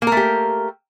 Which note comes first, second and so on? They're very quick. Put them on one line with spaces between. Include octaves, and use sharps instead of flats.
A#3 A#4 A3 G4